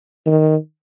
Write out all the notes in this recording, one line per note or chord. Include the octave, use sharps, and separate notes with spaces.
D#3